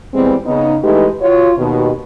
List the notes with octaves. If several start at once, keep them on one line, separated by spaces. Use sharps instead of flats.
E3 G3 G#3 B3 C4
C#3 B3 D#4
E3 G#3 A3 D#4 G4 B4
F4 F#4 C#5
D#2 B2